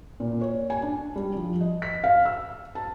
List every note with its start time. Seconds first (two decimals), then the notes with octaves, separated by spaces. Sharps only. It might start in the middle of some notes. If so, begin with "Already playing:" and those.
0.20 A#2
0.41 C#5
0.70 G#5
0.83 D4
1.16 G3
1.36 F3
1.61 D#5
1.82 B6
2.04 F5
2.25 E6
2.75 A5